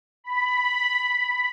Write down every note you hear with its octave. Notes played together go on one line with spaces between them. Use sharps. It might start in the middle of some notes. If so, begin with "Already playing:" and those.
B5